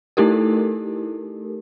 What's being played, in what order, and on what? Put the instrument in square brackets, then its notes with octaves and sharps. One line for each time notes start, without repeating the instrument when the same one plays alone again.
[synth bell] A3 D#4 E4 G4 A4 A#4